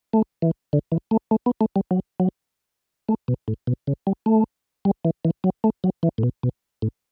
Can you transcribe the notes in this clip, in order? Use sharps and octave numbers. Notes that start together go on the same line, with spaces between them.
A3
E3
D3
E3
A3
A3
B3
A3
G3
F#3
F#3
A3
B2
A2
B2
C#3
G3
A3
G3
E3
E3
F#3
A3
F#3
E3
A2
B2
B2
A2